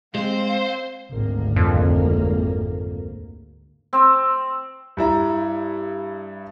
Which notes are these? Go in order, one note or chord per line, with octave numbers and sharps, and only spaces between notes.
G#3 C4 C5 F5
G#1 D2 A#3
F2
C4
G2 E4 A#5